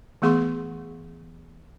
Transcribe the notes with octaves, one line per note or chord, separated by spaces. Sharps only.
E3 A3 B3 G#4 C6 C#6